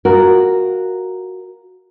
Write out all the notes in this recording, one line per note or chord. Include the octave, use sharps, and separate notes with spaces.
F4 F#4 A#4